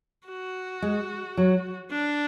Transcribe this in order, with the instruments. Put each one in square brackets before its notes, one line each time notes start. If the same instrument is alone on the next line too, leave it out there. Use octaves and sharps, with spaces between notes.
[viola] F#4
[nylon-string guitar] G#3
F#3
[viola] D4